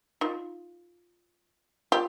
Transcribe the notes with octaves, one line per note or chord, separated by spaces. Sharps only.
D#4 F4
F4 G4